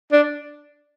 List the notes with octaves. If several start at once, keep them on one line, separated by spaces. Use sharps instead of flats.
D4